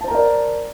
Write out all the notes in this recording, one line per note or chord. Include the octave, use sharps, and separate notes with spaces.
A#4 C5 D5 A5 A#5